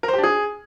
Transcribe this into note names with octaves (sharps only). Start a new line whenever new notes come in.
A#4
C5
G4
D4
G#4